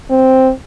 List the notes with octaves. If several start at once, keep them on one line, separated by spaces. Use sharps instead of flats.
C4